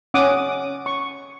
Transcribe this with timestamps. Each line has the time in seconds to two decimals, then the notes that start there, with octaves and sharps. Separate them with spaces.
0.14 C#4 F#5 D6 D#6
0.86 C#6